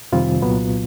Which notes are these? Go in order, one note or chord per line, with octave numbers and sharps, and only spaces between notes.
F2 C3 D#3 G3 C4 F4
C2 A#2 F#3 B3